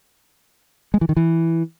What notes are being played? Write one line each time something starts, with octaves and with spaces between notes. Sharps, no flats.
G#3
E3
D#3
E3